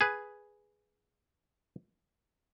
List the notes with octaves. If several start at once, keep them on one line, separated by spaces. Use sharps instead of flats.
G#4 B4